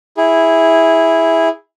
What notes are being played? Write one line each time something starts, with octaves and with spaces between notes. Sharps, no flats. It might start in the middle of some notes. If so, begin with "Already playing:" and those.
E4 G#4